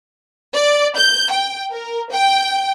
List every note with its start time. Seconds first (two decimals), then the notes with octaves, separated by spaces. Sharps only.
0.54 D5
0.97 G6
1.31 G5
1.71 A#4
2.11 G5